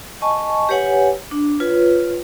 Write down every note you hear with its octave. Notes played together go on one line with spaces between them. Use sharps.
D#5 G#5 A5 C#6
G4 B4 C#5 F#5 G#5
D4
F4 B4 C#5